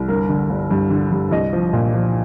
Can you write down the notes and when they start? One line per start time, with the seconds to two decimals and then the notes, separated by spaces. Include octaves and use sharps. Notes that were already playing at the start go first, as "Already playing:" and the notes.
Already playing: C2
0.08 G1 A#4
0.29 D3
0.49 G1
0.71 G2
0.90 D3
1.11 G2
1.31 C2 D#5
1.53 F3
1.73 A#2
1.94 F3